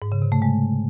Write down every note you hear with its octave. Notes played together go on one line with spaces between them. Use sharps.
G#2
C#3
C3
A3
G#3